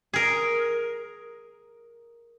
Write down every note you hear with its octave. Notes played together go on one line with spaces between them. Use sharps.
G#4 A#4